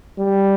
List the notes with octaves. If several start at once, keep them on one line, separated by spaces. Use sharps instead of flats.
G3